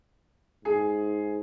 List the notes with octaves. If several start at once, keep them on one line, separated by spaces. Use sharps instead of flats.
G#2 G#4